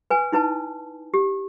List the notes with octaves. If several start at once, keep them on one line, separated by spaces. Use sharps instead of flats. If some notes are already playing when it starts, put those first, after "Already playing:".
B4 G#5
D#4 E4 B4 A5
G4